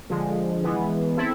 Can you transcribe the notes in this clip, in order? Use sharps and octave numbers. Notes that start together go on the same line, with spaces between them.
D3 F3 G#3
E3 G#3 B3
C4 E4 A4